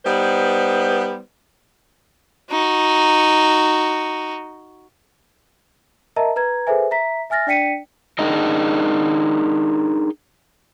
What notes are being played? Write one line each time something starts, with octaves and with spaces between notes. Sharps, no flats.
G3 B3 D#4 B4 C5
D#4 F#4
A#4 D#5 E5 A5 A#5
B4 A#5 G#6
G#4 A4 B4 C5 E5 G#5
E5 A#5 B6
E5 G#5 F6 A6 A#6
D4 D5 G5 B6 C#7 D#7
D4 D#4 G#4 A#4 D#5 G5